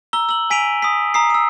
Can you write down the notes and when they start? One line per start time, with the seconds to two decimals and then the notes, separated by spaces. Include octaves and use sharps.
0.13 A#5 E6 G7
0.29 E6 F#7
0.50 G#5 B6 D7 D#7 F7
0.82 D#6 B6
1.14 A#5 D#6 C7
1.30 D#6 E6